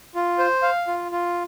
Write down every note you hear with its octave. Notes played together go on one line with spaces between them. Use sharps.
F4
C5
F5
F4
F4